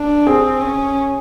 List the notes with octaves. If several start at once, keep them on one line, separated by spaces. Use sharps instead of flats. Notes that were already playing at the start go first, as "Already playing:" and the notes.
Already playing: D4
C4 G#4
C#4